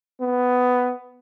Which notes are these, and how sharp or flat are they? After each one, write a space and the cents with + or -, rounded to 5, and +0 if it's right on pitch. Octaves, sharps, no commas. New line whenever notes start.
B3 +10